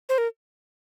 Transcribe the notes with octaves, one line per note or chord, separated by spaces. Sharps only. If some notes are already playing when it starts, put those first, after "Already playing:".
C5
A#4